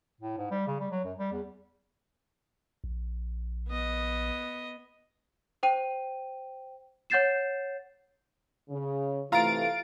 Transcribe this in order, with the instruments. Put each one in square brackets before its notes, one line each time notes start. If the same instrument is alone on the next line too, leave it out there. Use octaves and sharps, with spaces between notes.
[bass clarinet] A2
G#2
G3
C#3
G3
F#3
F#2
G3
E2
[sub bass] A#1
[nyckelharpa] B3 D#5
[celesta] C5 G5 D#7
C#5 F#5 G6 A6 C7 E7
[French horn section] C#3
[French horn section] C3 E3 A3 [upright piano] F4 A#5 [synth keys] F5 A6 D7